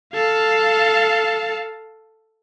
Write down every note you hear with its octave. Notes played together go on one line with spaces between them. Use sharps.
A4 F5